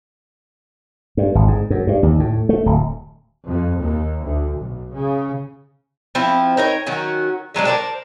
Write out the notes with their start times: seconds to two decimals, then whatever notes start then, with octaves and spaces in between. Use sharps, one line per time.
1.17 G2
1.35 G#1
1.48 G#2
1.70 F#2
1.87 G2
2.03 D#2
2.20 A2
2.49 A3
2.66 D1
3.46 F2
3.78 D#2
4.24 D2
4.58 B1
4.93 C#3
6.15 F3 C4 E4
6.57 D#4 A#4 B4 C#5
6.87 D#3 F#3 C#4 F#4
7.54 C#3 F#3 G#3 D4
7.67 A#4 C5 D5 A5